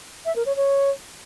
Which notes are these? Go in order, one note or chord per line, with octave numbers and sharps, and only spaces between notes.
E5
A#4
C#5
C#5